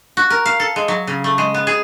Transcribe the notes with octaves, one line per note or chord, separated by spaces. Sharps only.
F#4
A#4
F5
A4
G#3
F#3
C#3
A3
G#3
B3
G#4